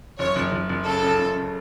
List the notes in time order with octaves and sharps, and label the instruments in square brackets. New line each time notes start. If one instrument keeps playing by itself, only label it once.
[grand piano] F#1 [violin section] C#5
[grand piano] F#1
F#1
F#1
[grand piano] C#3 [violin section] A4
[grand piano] C#3
F#1
C#3